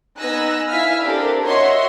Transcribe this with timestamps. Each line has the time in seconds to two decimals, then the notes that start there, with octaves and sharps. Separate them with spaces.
0.17 B3 D#4 G#5 E6 F#6 A#6
0.69 E4 E5 F5 G#5 F6 B6
1.04 C4 D4 G4 A4 A#4
1.45 F#4 C#5 D#5 E5 F#5 C6